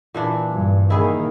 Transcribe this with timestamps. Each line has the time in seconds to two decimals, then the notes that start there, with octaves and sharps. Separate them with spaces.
0.14 A#2 E3 D4
0.52 G2
0.90 D#3 A#3 E4 G#4